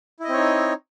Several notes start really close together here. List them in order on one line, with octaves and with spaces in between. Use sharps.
E4 D#5 C4 C#5 D#4